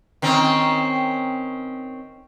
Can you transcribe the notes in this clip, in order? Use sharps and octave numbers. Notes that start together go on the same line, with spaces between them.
D#3 C4 C#4